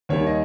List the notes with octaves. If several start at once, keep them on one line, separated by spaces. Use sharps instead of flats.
D#2 D#3 G3 C#5
D#5